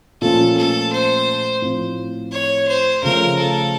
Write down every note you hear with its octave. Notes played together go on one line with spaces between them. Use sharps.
A#2 F3 A3 C#4 F4 A4
A4
C5
A2 F3 C4
C#5
C5
C#3 F3 A3 A#4
A4